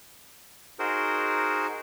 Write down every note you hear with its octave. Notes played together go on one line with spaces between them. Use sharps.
D#4 F#4 G#4 A#4 C5